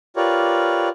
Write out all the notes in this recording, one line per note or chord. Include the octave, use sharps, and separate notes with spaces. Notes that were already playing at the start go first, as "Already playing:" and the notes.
F4 G4 A#4 B4 C#5 D5